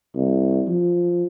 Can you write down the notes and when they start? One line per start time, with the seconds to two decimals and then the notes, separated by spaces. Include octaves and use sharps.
0.15 C2
0.68 F3